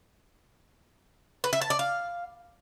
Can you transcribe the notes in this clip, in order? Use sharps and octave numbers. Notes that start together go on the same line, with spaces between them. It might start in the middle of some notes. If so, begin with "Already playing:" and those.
B4
E5
A5
D5
F5